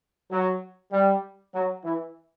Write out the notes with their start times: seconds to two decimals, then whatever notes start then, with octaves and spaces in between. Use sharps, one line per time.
0.31 F#3
0.92 G3
1.55 F#3
1.84 E3